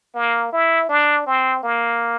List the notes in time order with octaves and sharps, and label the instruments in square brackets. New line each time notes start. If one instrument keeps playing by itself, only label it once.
[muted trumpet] A#3
E4
D4
C4
A#3